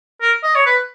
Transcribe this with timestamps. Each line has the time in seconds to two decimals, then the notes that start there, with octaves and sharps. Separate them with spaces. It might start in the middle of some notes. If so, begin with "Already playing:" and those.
0.21 A#4
0.43 D#5
0.55 C#5
0.66 B4